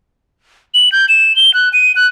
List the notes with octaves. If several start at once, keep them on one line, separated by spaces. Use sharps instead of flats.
F#7
G6
E7
G7
F#6
D#7
F#6